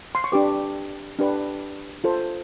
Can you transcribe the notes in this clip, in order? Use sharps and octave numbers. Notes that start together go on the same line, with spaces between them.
C6
C#6
D4 G4 B4 D6
D4 G4 B4
F4 A4 C5